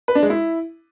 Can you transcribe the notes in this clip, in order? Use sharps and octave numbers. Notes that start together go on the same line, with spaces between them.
B4
D4
G#3
E4